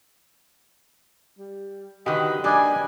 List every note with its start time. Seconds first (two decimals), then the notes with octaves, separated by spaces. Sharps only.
1.39 G3
2.06 D3 D#3 F#4 G4 B4 D#5 F5
2.44 G3 A#3 D4 D5 D#5 G5 G#5